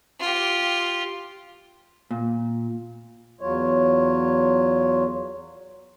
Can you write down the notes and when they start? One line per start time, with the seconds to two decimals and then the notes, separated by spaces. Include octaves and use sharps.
0.20 F4 G4
2.11 A#2
3.41 E2 F#3 F4 C#5